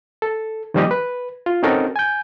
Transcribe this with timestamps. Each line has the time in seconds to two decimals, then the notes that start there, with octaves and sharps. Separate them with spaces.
0.22 A4
0.74 D#3 F3 G3 A#3 G4 D#5
0.91 B4
1.46 F4
1.63 C4 C#4 D#4 F#4 A4 A#4
1.96 G#5 G6